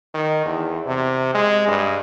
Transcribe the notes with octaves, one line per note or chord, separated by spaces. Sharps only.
D#3
E2
C3
G#3
G2